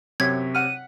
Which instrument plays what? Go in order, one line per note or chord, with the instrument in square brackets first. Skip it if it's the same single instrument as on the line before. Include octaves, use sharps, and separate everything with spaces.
[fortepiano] F#2 [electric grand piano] C3 C#5 B6 [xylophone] G#6
[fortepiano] F#5 F6 [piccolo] D#7